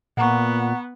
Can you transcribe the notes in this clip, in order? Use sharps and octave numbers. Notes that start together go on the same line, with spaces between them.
A#2 B3 F#5 A#5 C#6